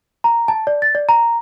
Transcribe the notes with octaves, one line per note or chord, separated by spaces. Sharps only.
A#5
A5
D5
A6
D5
A#5